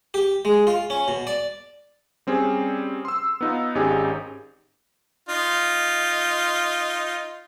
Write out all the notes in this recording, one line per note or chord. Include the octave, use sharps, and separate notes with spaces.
G4
G#3
F4
C#4
B2
D5
G3 C4 C#4 G#4
C6 E6
B3 D#4 F4
G#1 C#4 D#4 G4 G#4
D#4 F4